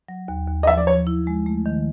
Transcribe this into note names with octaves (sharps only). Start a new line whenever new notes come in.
F#3
D#2
D#2
D#5
F3 E5
D5
F3 C#5
E4
G#3
A3
D#3